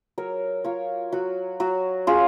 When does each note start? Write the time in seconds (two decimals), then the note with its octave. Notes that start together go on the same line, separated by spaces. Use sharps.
0.18 F#3 A#4 C#5
0.64 F4 A#4 C#5
1.12 F#3 F#4
1.60 F#3 F#4
2.07 C#4 F4 G#4